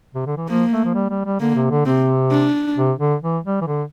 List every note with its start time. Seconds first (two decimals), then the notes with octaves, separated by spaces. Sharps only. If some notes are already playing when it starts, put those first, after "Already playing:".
0.15 C3
0.26 D3
0.37 E3
0.49 F3 A#3
0.72 A3
0.85 F3
0.94 G3
1.10 G3
1.25 G3
1.40 D3 A#3
1.55 C3
1.71 D3
1.86 C3 C4
2.31 D4
2.77 C3
2.99 D3
3.23 E3
3.45 G3
3.61 E3
3.67 D3